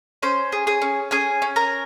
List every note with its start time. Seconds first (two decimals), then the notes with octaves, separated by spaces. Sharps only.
0.23 C#4 C5 C6
0.52 G#4
0.67 G#4 G#5
0.82 C#4
1.11 C#4 G#4 G#5
1.42 C#4
1.56 A#4 A#5